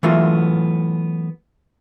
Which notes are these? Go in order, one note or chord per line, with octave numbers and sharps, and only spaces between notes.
E3 F#3 A3 B3 F4